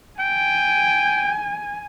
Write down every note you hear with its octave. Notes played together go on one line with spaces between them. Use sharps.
G5 G#5